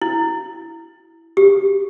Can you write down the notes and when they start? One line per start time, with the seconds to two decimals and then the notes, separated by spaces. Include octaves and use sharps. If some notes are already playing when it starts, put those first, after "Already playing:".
0.02 E4
1.37 G4